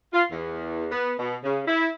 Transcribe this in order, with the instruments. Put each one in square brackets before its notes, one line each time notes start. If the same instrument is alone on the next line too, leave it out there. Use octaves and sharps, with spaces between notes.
[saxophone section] F4
E2
B3
B2
C#3
E4